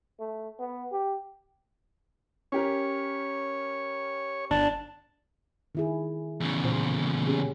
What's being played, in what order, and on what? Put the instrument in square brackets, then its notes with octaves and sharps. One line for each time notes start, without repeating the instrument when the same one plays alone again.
[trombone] A3
B3
G4
[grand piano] C#4 G4 A#4 [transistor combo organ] C#5
[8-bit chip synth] G1 [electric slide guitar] D4 [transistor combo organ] A5
[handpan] D#3 E4 G#4
[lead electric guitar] E2 C#3
[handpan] A#2 C5
C#4 G4 G#4